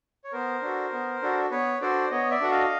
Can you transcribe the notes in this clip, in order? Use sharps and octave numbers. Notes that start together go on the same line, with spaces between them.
C#5
B3 A#4 C5
D4 F#4 A4
B3
D4 F#4 A4
B3 B4 C#5
D4 F#4 A4 C5 D5
B3 C#5 D#5
D5 E5
D4 F#4 A4 F#5
D#5 F5